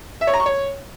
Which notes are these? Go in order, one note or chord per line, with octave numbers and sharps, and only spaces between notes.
E5
C#5
A#5
C#6
C#5